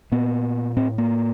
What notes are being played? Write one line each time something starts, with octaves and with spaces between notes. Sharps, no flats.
A#2 B3
A2 C4
A#3